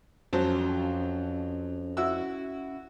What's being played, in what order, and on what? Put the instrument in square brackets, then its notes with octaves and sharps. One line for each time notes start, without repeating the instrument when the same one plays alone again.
[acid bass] F2 [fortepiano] F#3 C5 A5 [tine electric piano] C#4
[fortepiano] E4 F#4 E6